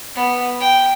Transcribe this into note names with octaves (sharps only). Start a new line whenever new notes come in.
B3
G5